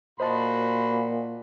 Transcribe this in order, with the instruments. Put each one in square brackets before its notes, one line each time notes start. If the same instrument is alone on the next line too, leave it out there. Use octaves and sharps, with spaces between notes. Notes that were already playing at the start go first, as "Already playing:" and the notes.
[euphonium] A#2 [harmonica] F#4 B5 C6 [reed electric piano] C5 D#5 A5